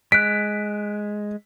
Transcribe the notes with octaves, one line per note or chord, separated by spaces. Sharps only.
G#3 F#6 B6 D7